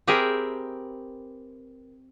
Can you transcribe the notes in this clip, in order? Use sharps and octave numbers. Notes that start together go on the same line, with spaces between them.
C4 G4 G#4 A#4 B4 E5